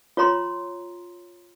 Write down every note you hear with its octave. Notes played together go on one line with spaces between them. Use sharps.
F4 C#5 A#5 C6